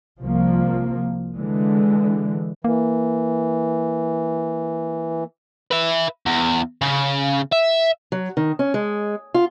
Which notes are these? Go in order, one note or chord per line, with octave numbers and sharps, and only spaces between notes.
C2 F3 A#3
D3 E3 G#3
E3 A#3
B4 E5
E2
C#3
E5
F#3
D#3
C#4
G#3
F4